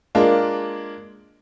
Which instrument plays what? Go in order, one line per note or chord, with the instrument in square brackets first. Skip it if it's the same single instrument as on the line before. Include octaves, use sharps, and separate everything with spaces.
[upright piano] G#3 A#3 D4 F4